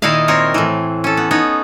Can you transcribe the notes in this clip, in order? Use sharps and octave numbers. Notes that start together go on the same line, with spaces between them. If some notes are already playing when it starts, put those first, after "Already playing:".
A#2 D#3 D#4 E4 D#5 F5
A#2 C4 A#4 C#5
A2 E3
C#4 A4
B3
B3 D#4 C#5